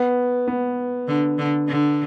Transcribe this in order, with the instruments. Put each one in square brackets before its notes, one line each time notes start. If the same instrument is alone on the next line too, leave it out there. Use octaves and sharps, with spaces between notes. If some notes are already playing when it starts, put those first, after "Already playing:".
Already playing: [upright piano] B3
B3
[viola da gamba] D3
D3
D3